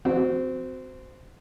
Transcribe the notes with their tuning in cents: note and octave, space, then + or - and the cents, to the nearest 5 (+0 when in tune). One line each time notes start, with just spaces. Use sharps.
C4 -20 F#4 +0